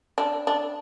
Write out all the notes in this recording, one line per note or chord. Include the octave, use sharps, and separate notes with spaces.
D4
D4